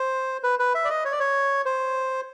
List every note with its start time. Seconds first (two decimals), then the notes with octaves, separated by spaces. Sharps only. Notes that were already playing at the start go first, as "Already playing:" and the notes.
Already playing: C5
0.43 B4
0.59 B4
0.75 E5
0.85 D5
0.90 D#5
1.05 C#5
1.12 D5
1.20 C#5
1.65 C5